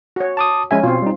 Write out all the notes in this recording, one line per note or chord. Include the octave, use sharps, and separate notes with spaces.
F#4 C#5
A5 D6 D#6
F3 G#3 C#4 E5 G#5
B2 C4 F4 C#5
G3 D#4